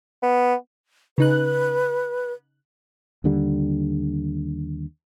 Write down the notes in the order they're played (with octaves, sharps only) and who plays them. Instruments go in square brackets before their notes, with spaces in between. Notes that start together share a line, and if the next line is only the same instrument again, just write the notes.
[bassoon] B3
[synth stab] C#3 D#4 F#6 [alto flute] B4
[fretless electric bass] D#2 D3 G3